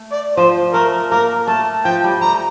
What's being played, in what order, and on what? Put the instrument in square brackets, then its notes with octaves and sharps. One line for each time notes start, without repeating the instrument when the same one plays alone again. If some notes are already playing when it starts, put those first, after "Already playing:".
Already playing: [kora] A3
[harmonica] D5
[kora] F3 [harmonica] C5
[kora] A3 [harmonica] A#4
[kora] A#3 [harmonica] A#4
[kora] A3 [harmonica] A5
[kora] F3 [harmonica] G5
[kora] G3
[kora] A3 [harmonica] A#5